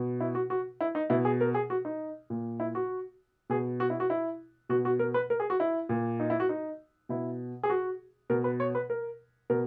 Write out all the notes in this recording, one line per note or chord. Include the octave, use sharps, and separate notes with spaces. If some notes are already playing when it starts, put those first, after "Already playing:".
Already playing: B2
E4
F#4
F#4
E4
D#4
B2 E4
G#4
A#4
G#4
F#4
D#4
A#2
E4
F#4
B2 G#4
F#4
E4
F#4
E4
B2 F#4
F#4
A#4
B4
A#4
G#4
F#4
E4
A#2
D#4
E4
F#4
D#4
B2 E4
G#4
F#4
B2 A#4
B4
C#5
B4
A#4
B2 A#4